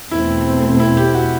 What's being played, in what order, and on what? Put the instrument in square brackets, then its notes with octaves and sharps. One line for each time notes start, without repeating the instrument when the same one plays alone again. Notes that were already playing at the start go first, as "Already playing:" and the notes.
[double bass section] E2 B2 A3 C4 [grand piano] E4
[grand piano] E4
G4
F#4